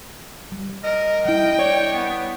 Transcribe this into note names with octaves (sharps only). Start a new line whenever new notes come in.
G3
A#4 D#5
G3 E4 G5
C#5 D5
B3